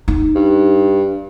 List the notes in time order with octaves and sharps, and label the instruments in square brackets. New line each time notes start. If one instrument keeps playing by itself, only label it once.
[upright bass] D#4
[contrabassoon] G2